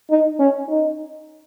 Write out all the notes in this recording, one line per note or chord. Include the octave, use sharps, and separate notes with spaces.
D#4
C#4
D#4